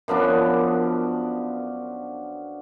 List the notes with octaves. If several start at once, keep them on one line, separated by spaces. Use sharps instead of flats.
F#2 F3 B3 D4